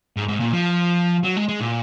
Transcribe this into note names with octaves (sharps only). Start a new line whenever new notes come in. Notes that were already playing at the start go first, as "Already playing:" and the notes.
G#2
G#2
A#2
F3
F#3
G#3
G#3
A#2